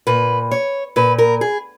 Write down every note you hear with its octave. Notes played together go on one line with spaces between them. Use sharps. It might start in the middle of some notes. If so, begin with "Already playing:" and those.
A#2 B4
C#5
A#2 B4
A#4
G#4